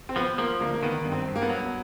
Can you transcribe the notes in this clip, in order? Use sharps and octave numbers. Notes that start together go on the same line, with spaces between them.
C4
F3 B3
F3 A#3
D2 A#3
A#3
D#3 B3
G2
C4
G2
A#3
B3
F#3